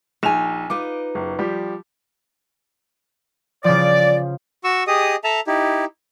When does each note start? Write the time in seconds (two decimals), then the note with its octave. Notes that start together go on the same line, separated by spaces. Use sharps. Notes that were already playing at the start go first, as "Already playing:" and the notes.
0.23 A#1 D#4 G#5 E7 F7
0.70 D#4 F4 B4 D6
1.15 F#1
1.39 F3 G3 G4
3.64 C#3 F3 D5
4.64 F#4 C#6 E6
4.87 G4 G#4 D#5 D#6
5.24 A4 E5 A5 A#5
5.47 D#4 E4 G4